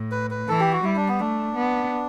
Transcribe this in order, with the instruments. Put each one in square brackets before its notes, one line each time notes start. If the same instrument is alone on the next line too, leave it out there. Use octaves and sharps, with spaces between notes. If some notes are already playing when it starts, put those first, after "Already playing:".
Already playing: [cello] A2
[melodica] B4
B4
[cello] E3 [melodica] A4
[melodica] G4
F#4
[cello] G3 [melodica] E4
[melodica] D4
B3
[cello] A3 [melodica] D4
[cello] B3